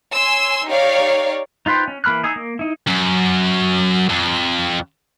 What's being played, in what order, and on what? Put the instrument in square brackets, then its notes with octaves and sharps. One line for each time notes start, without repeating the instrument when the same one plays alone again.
[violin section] C#5 G#5 C6 E6
D#4 G4 C#5 D5 F5
[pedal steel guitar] D#4 F4 B4 C5 G5
C#4
E3 A#3 B5 F6 F#6
D#4 G#4 G#5 E6
A#3
D#4 E4
[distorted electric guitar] F#2
F2